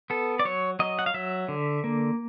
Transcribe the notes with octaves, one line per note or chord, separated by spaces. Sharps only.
B3 A4
D5
F#3 C#5
F#3 D#5
F#5
F5
F#3 E5
D3
A#3